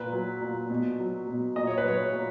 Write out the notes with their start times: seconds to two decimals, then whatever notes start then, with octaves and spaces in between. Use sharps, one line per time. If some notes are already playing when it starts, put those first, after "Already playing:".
Already playing: A#2 B4
0.12 F#3
0.42 A#2
0.70 B2
0.99 F#3
1.28 B2
1.56 A#2 D#5
1.67 C#5
1.78 B4
1.85 F#3 C#5
2.13 A#2